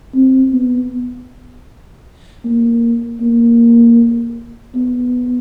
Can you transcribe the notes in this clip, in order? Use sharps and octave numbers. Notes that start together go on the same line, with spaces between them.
C4
B3
A#3
A#3
B3